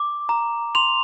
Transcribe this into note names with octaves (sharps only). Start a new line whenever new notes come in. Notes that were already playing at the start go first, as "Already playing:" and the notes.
Already playing: D6
A#5
C6 F7